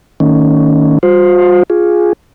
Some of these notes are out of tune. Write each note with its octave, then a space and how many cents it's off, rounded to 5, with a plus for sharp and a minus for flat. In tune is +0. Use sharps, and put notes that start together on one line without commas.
D#3 +0 A#3 -45 C#4 +10
G3 +0 F4 +45 C5 +0
F4 +5 G#4 +0